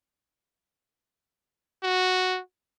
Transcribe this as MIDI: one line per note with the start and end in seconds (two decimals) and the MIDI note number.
1.83 2.40 66